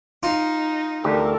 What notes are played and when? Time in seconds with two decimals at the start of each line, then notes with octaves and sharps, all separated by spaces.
0.23 D#4 F4
1.04 D2 G4 A4 A#4